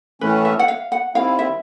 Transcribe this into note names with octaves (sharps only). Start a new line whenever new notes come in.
A2 E3 A3 C#4 B4
E5
F#5
F5
F#5
D#3 G3 C4 E4 F5
E5